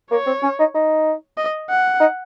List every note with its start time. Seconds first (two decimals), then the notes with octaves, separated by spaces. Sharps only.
0.11 A#3 C#5
0.26 C4
0.43 C#4
0.59 D#4
0.75 D#4
1.37 D#5
1.70 F#5
2.00 D#4